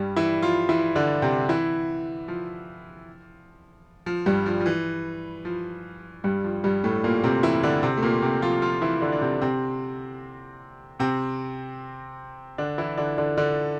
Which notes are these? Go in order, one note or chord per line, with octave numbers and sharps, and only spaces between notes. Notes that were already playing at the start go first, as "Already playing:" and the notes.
Already playing: G2 G3
E3 E4
F3 F4
E3 E4
D3 D4
C3 C4
E3 E4
F3
F3
G2 G3
F3
F3
E3
F3
G2 G3
F3
G2 G3
A2 A3
A#2 A#3
C3 C4
E3 E4
D3 D4
C3 C4
A3
A#2 A#3
C3 C4
F3 F4
F3 F4
E3 E4
D3 D4
D4
C3 C4
C3 C4
C3 C4
D3 D4
E3 E4
D3 D4
D3 D4
D3 D4